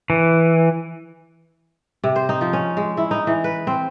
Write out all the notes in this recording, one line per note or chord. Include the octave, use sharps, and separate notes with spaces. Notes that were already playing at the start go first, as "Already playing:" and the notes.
E3
C3
C5
D#4
F3
C#4
G#3
E4
D#4
E3
B4
C4